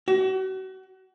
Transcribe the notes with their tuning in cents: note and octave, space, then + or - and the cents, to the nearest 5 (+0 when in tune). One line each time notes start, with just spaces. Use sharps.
F#4 +35